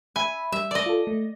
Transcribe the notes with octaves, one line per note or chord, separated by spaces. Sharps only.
E5 G#5 B5
G3 E5
D5 D#5
F4 A4
A3